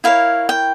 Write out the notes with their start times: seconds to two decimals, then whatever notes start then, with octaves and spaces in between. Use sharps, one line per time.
0.04 E4 A#4 C#5 F5
0.49 G5